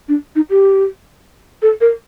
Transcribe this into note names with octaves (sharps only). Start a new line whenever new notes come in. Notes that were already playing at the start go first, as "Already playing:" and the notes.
D4
D#4
G4
A4
A#4